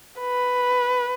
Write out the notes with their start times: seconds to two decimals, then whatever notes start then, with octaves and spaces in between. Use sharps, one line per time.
0.20 B4